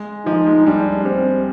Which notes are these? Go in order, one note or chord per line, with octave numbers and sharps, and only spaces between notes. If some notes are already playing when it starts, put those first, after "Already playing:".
Already playing: G#3
F3 D#4
G#3
G3 D4
G3 C4